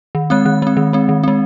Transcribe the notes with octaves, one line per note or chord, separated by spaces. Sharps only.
D#3
G#3 C4 F#6
D#3 F#6
G#3 C4
D#3
G#3 C4
D#3
G#3 C4